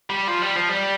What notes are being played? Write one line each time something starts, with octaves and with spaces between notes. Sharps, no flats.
G3
F3
G3
F3
G3